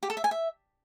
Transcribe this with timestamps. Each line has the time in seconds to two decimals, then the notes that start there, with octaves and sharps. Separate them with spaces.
0.03 G4
0.10 A4
0.17 E5
0.24 G#5
0.31 E5